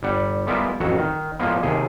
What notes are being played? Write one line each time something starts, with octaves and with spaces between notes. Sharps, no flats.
G1 G3 F#5
G3 G#3 B3 E4 F4 A#4
A1 F2 F#3 F#4 C#5
D#3
A2 F3 G#3 A#3 B3
D#2 C3 G#4